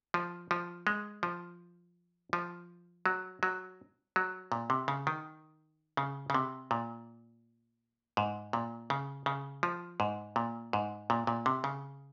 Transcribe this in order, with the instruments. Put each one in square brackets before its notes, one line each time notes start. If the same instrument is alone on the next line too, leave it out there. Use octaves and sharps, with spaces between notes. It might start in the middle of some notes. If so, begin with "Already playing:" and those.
[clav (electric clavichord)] F3
F3
G#3
F3
F3
F#3
F#3
F#3
A#2
C3
C#3
D#3
C#3
C#3
C3
A#2
G#2
A#2
C#3
C#3
F3
G#2
A#2
G#2
A#2
A#2
C3
C#3